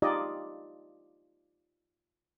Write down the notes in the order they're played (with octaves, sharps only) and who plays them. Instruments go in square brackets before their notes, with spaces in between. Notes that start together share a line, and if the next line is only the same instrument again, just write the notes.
[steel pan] D#4 F4 G4 D5 D#5